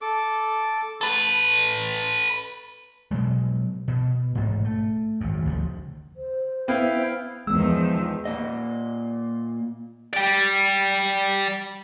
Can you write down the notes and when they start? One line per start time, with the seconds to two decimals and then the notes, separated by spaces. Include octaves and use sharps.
0.01 A4 D6
1.01 A4 B4
3.11 B2 F#3 G#3
3.88 B2
4.35 A1 G#2
4.65 A3
5.21 G#1 F#2
5.45 D2 C#3 F3
6.16 C5
6.68 B3 E4 F5 G5
7.47 E2 D#3 F3 G#3 B3 E6
8.25 A#2 D#5
10.14 D5 G5